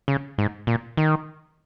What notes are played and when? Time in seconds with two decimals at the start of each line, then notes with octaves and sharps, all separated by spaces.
0.08 C#3
0.38 G#2
0.67 A#2
0.97 D#3